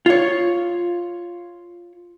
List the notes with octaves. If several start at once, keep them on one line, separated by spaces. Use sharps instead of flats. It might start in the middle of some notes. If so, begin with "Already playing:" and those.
F4 C#5